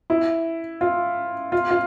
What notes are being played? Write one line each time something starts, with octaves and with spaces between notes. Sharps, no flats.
E4
F4
F4
F4